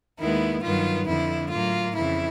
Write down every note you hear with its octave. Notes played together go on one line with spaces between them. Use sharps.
D#2 D#3 G#3 B3 E4
G2 D#3 F#3 B3 F4
F2 D3 F3 E4
A2 F#3 A#3 F4
F2 C#3 E3 E4